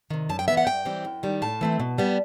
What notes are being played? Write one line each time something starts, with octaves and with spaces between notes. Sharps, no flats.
C3 D#3
F#2 A5
G5
E3 B3 E5
F#5
G2 G5
E3 G3 C4
F#2
D#3 G3
A2 A5
E3 A3 C4
B2
G3 B3